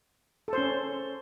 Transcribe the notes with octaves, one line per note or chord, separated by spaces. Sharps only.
C#4 A4 C5